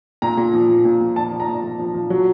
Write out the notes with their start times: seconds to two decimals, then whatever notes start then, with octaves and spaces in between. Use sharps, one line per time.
0.22 A#2 A#5
0.37 A#2
0.53 F3
0.69 F3
0.85 A#2
1.01 A#2
1.16 F3 A5
1.32 F3
1.40 A#5
1.48 A#2
1.64 A#2
1.79 F3
1.94 F3
2.10 F#3